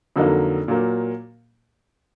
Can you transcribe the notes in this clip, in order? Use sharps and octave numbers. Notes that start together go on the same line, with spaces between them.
F2 D3 F#3 A#3 D#4
A#2 F#3 A#3